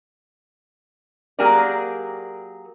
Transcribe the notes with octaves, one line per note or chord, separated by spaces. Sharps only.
F#3 A#3 G4 G#4 A#4 D5